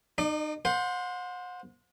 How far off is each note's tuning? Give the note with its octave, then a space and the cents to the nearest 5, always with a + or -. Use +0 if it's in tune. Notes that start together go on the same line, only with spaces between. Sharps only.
D#4 -30 D5 +35
C5 +0 F#5 -40